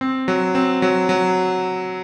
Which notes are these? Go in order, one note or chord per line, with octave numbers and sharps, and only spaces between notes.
C4
F#3
C4
F#3
F#3